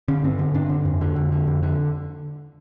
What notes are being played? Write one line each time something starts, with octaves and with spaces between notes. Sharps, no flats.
D3 C#4
G2 C4
D3
G2 D4
D3
F2
D3
F2
D3
F2
D3